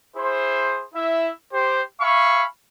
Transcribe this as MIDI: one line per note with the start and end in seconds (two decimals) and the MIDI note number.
0.17 0.85 64
0.17 0.85 68
0.17 0.85 72
0.94 1.31 64
0.94 1.31 76
1.52 1.81 67
1.52 1.81 72
2.01 2.43 76
2.01 2.43 77
2.01 2.43 80
2.01 2.43 83
2.01 2.43 85